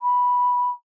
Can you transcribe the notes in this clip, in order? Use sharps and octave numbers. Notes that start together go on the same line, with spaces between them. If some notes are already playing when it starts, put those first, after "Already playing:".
B5